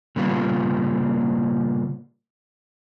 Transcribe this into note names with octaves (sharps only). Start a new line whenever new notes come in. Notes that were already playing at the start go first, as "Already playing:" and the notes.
A#2 C#3 G3 A#3 B3 F4